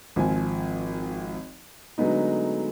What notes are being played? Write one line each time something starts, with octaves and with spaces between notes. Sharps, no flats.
G#1 F3 C4 G#5
D3 F#3 G#3 A3 B3 D#4